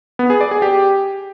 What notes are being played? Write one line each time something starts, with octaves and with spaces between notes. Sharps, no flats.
B3
G#4
D5
G#4
G4